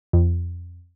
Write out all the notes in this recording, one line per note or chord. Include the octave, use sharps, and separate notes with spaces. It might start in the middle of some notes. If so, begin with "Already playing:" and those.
F2